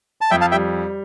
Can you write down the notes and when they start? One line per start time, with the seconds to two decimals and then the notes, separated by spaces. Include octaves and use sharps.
0.21 A5
0.31 F2 E5 G5
0.41 F5 A5
0.51 G3 E5 G5